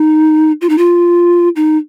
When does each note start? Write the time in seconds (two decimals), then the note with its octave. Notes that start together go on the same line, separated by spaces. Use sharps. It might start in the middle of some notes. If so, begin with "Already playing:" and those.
Already playing: D#4
0.61 F4
0.69 D#4
0.78 F4
1.56 D#4